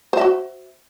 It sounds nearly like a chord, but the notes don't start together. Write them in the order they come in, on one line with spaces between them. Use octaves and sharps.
C5 E5 F#4